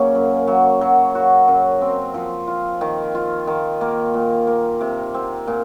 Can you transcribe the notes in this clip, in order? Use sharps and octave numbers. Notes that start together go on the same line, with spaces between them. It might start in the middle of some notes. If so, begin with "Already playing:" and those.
Already playing: C#3 F#3 A#3 C#4
F#2
F#3
F#3
F#4
F#2
C4
F3
F4
D#3
F4
D#3
A#3
A#2
A#3
C3
C4
A#2